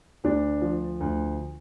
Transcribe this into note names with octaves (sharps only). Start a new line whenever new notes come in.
D2 D4
F3
D2